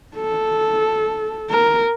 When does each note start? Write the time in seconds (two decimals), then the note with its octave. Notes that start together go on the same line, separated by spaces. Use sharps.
0.16 A4
1.51 A#4